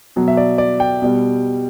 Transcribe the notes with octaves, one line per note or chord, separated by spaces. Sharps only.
B2 F#3
E5
D5
D5
G5
B2 G3